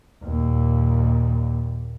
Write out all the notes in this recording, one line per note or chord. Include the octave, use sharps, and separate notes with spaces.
D#2 A#2